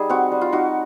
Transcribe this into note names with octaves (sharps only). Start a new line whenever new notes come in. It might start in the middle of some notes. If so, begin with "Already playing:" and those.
Already playing: G3 D#4 G#4
C4 F#4
G3
F4
D#4 F#4